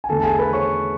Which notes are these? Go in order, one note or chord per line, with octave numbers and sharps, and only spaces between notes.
G#5
E2 D3 A3 A4 A5
A5
G#4 G#5
B4 B5
C#5 C#6